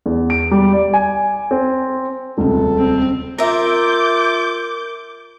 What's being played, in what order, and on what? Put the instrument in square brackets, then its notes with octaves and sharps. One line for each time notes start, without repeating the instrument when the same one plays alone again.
[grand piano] E2
D7
G3
D5
G#5
C4
[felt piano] D#1 C#2 C3 [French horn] A4
[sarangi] C4
[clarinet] F4 [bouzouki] A#4 E5 [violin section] D6 G6